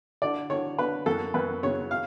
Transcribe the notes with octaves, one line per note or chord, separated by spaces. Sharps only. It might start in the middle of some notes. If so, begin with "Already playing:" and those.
D3 D5
D3 C#5
D3 B4
F#2 A4
F#2 B4
C#3 C#5
F5